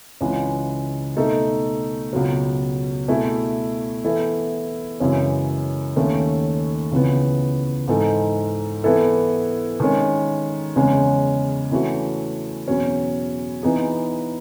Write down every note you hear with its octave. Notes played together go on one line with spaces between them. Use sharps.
C#2 C#3 E3 G#3
B2 A3 D#4 A4
C#2 B2 F#3
B2 A3 E4 G#4
E3 B3 E4 A4
F#2 C#3 E3 G#3 C#4
D#2 D#3 A3 C#4
C#2 C#3 E3 B3
G#2 E3 G#3 D#4 A4
E3 B3 E4 A4
D#3 G#3 C#4
E2 C#3 G#3 C#4
E3 A3 C#4 F#4
E2 B2 F#3 C#4
E3 B3 D#4 G#4